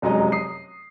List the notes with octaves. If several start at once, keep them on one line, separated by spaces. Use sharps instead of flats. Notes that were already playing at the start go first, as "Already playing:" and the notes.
F1 F#2 F#3 G#3 D#5 A#5
D#6 C7